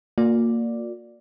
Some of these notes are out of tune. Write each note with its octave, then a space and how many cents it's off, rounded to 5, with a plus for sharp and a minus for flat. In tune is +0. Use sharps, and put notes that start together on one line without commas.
A#3 -15 F4 +45 D5 +0